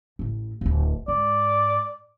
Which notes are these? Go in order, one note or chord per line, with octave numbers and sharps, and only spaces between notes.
A1 A2
D1 G1
G#2 D5